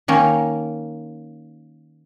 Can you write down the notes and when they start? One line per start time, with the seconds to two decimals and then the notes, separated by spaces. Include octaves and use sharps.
0.08 D#3 A#3 C#4